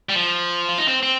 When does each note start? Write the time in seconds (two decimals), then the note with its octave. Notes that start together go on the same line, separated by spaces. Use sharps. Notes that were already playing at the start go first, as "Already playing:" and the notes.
0.09 G3
0.15 F3
0.69 F4
0.78 D#4
0.88 C4
1.03 C4